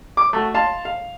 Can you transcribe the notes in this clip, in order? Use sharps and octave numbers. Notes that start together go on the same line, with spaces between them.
D6
A3 F#4
F5 A5 C6
F5